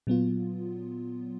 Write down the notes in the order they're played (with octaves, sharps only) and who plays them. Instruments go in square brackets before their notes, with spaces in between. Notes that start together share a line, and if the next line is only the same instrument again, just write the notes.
[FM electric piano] A#2 F#3 B3 F4